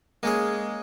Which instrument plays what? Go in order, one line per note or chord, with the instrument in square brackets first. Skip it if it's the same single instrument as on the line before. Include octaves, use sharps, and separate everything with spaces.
[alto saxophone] G#3 [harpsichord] A#3 C#4 G#4